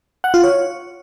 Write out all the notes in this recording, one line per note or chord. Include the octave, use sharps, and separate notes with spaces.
F#5
F4
C#5